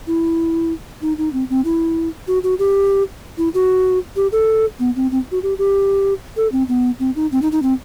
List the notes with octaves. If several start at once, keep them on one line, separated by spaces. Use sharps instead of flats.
E4
D#4
D#4
C4
C4
E4
F#4
F#4
G4
E4
F#4
G4
A4
B3
C4
C4
F#4
G4
G4
A4
C4
B3
C4
D#4
C4
D#4
D#4
C4